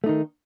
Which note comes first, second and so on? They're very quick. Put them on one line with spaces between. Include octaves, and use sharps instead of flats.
A3 D#4 D#3